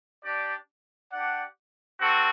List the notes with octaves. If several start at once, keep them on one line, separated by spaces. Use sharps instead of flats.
D4 G4 D5
D4 G4 D5 F#5
C4 F#4 A4